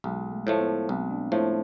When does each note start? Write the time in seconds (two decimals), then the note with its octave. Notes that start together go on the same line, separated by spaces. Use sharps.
0.04 B1 G#3
0.32 A3
0.47 A2 F3 A3
0.60 B3
0.89 B1 C4
1.10 D4
1.32 A2 F3 A3 E4